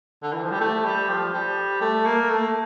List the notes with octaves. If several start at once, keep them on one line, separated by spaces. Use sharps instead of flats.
D3
E3
F3
G3
A3
G3
F3
G3
A3
A#3
A3